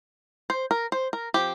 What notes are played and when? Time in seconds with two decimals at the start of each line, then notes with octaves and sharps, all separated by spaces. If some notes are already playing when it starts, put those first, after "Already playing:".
0.50 C5
0.71 A#4
0.92 C5
1.13 A#4
1.34 F3 C4 G4